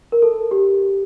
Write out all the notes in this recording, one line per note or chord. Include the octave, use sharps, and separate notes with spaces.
A#4
A4
G4